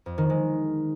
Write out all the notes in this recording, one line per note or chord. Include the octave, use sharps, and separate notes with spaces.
F2
D#3
G#3